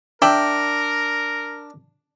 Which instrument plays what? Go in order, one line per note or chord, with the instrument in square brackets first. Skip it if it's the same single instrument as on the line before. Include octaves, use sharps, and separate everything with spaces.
[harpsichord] D4 [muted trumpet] A#4 [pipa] D5 E5 G5